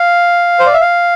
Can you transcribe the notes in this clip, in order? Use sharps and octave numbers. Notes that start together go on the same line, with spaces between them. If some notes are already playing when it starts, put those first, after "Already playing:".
Already playing: F5
C5
D5
E5
F5